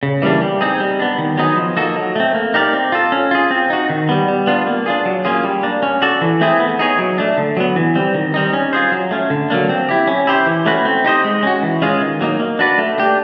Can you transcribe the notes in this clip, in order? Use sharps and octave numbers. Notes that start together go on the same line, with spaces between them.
C#3
E3 G3 A#3 D4
G3
C4 D#4 G#4
G3
B3 D4
D#3
F#3 B3 D#4 G#4
F3
A#3 D#4 F#4 A4
F#3
A3 C4
A#3
D#4 G4 A#4 D5
C4
F4 A4
C#4
F4 G#4
C4
D#4 F#4
D#3
G3 B3
G3
B3 D4 F4
A#3
D4 F4 G#4
F#3
A#3 C#4 F4 G#4
G3
A#3 D4
C#4
F#4 A4 D5
E3
A3 C4 E4 G#4
B3
D#4 G#4 C#5
F#3
A3 D4
D3
F#3 B3
E3
G3 C4
D#3
G3 C4 D#4
C#4
F4 G#4 C5
F#3
A3 C#4
D3
F#3 A#3 D4
C4
E4 G4
C#4
E4 G4 C5
E3
A3 C#4 F#4 B4
C4
D#4 G4 C5 D#5
G#3
C#4 F#4
E3
G#3 C#4 F4 G#4
D#3
F#3 A#3 D#4
A#3
D4 F#4 B4 D5
A3
D4 G4